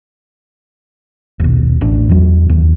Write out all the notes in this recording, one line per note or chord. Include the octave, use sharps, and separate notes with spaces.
D#1 B1
A1 D4
E2 F#3
D#2